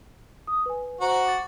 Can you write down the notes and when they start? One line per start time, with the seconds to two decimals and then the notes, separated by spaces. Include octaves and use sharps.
0.47 D#6
0.66 B4 G#5
1.01 F#4 C5 A#5
1.26 D6 A6